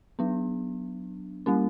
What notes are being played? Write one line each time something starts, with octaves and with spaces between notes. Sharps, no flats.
F#3 B3 D4
G3 A#3 C#4